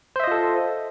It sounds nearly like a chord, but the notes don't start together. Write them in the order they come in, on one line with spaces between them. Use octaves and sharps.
C5 E5 D#5 F4 A4